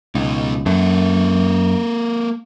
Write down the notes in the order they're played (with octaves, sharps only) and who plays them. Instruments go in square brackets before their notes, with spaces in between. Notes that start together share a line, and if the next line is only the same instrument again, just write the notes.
[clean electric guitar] C#2 [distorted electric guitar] B2 D#4
[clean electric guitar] F#2 [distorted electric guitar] A#3 A4